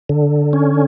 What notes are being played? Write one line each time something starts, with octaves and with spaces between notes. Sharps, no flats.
D3
C#4